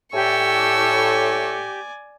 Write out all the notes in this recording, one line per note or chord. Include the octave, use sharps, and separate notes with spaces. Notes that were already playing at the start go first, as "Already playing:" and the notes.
A2 G4 D5 G#5 C#6 E6